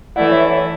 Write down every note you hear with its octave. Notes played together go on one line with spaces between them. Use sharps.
E3 A3 E4 D5 F#5
C#5 E5
A4 C#5